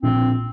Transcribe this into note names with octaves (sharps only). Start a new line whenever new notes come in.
A#1 C4